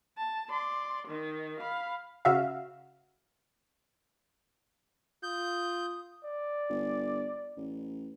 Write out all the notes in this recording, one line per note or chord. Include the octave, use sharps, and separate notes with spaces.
A5
D5 C6
D#3 D#4
F5 B5
C#3 F#4 E5 F5
F4 D#6 G6
D5
G1
A1